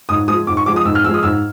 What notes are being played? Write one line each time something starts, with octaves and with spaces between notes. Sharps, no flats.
G#2 D#6
F3 G#3 D#6
G#2 D6
C#6
F3 G#3 D6
D#6
G#2 E6
F6
F3 G#3 E6
D#6
G#2 E6